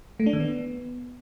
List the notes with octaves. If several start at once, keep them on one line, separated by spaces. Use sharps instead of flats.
A3
D4
D#3
B3